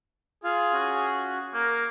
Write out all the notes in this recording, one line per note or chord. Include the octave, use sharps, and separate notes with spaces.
F4 G#4 F5
C#4 F#4
A#3 A#4